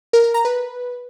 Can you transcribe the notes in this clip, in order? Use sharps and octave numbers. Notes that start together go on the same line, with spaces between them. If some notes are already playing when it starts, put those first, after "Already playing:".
A#4
A#4
A#5
B4